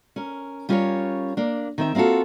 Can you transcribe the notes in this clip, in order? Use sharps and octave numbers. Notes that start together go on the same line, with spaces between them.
C#4 A#4
G3 C#4 F4 A#4 B4 C#5
A#3 D4
D#3 C4 E5
A#3 C4 F4 F#4 A4